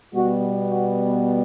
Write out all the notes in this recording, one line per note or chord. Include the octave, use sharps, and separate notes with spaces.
B2 G3 B3 F#4
F#4